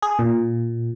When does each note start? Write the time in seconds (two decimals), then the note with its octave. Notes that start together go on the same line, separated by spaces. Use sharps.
0.02 G#4
0.19 A#2